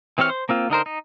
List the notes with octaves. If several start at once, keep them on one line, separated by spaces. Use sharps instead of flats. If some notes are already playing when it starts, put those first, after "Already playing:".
E3 C4 G4 C#5 F6
C5
A#3 C4 F4
D3 D#4 A#4 C5
D#4